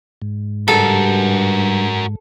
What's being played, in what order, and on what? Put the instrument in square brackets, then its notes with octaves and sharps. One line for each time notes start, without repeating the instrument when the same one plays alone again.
[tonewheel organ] G#2
[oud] G2 C#3 [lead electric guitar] F#4 A#4 [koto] A4